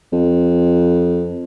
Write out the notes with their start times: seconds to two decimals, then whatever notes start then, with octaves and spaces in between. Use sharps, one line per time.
0.13 F2